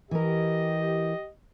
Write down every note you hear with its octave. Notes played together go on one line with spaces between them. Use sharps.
E3 G4 A#4 D#5